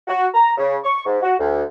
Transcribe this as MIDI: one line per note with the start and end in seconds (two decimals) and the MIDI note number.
0.08 0.27 66
0.34 0.52 82
0.58 0.77 49
0.84 1.02 85
1.06 1.19 44
1.23 1.34 66
1.39 1.63 38